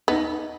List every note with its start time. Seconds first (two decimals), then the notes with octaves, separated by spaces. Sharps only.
0.08 B3 D#4